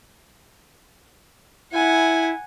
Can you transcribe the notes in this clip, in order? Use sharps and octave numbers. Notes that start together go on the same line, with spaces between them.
E4 F#5 G#5